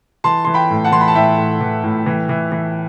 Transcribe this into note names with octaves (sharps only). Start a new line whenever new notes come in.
E3 A5 C6
E3 C6
G5 B5
A2
F#5 A5
E3 C6
B5
A5
A2 E5 G5
A2
E3
A2
E3
E3
E3